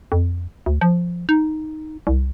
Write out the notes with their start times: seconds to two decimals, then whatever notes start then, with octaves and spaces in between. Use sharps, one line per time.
0.12 F2
0.66 D2
0.81 F3
1.29 D#4
2.07 C2